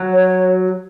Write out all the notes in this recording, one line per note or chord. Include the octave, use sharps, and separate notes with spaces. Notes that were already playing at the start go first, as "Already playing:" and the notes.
Already playing: F#3
C#5